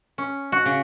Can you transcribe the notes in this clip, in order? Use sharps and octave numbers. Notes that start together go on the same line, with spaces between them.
C#4
F#4
C#3